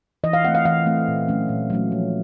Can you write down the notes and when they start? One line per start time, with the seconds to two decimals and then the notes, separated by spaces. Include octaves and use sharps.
0.24 E3 D#5
0.33 F5
0.44 A3 C4 F#5
0.55 F5
0.65 E3 F5
0.86 A3 C4
1.08 A#2
1.28 F#3 A3 C#4
1.49 A#2
1.70 F#3 A3 C#4
1.92 F3